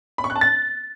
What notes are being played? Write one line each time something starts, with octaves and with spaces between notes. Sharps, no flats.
B5
C#6
F#6
A5
A6